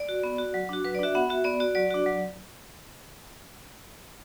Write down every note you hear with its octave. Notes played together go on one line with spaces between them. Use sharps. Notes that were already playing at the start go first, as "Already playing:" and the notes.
Already playing: D5
F#4
B3
F#4
F#3
D4 F#4
F#3 B4
D5
D4 F#4 E5
B3 F#5
F#4 E5
B3 D5
F#4 D5
F#3 D5
D4 F#4
F#3